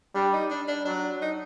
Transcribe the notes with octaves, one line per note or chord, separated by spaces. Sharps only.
G3 D4
D#4
D4
D4
F#3 D4
D#4